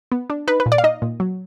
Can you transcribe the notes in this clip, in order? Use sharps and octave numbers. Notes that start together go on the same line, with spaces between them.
B3
D4
D#4 B4
B4
A#2
D5
F5
D#4 D#5
A#2
F#3